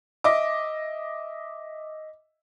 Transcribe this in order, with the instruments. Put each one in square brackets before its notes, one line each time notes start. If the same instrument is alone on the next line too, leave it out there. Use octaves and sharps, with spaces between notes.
[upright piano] D#5 E5 D6